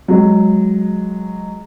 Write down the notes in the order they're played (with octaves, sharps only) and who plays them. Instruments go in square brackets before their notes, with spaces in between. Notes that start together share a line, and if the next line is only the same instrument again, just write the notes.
[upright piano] F#3 G#3